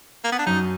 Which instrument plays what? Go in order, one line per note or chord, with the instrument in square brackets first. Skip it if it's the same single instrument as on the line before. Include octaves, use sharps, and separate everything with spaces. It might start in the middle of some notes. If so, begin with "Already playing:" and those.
[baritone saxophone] A#3
B3
D4
[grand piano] F#2 [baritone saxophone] D#4